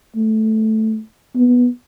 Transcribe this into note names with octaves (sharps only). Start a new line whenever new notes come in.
A3
B3